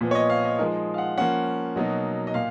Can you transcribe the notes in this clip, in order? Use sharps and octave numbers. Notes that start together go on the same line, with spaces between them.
A#2 F3 B3
C#5
D#5
F5
D#5
F3 G#3 D#4 A#4
F5
F#5
F3 A#3 C#4 F#5
B2 F#3 A#3 D#4
D#5
A#2 F5